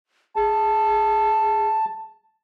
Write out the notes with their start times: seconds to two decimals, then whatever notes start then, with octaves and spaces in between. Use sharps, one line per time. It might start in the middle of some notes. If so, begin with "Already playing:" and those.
0.36 G#4 A5